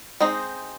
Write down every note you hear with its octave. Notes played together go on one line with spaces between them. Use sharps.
G#3 C4 D#4